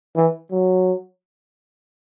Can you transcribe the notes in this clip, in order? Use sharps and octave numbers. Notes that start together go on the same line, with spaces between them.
E3
F#3